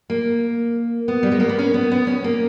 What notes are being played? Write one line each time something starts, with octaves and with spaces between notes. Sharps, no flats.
A#3
B3
G3
G#3
A#3
B3
C#4
B3
B3
C#4
A#3